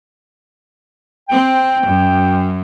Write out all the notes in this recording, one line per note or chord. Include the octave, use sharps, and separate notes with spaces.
C4 G5
F#2